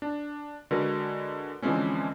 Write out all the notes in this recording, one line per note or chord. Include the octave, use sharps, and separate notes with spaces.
D4
D3 G#3 F#4 A#4 B4
D3 E3 F3 G#3 C4 C#4